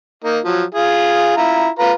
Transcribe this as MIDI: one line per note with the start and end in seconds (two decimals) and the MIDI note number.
0.24 0.39 58
0.24 0.39 63
0.44 0.63 53
0.44 0.63 54
0.75 1.37 65
0.75 1.37 68
1.37 1.68 64
1.37 1.68 65
1.37 1.68 82
1.79 1.92 65
1.79 1.92 71
1.79 1.92 82